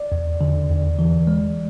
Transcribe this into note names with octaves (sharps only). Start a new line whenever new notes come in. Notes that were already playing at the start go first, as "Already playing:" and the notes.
Already playing: D5
E2
D3
E2
E3
G#3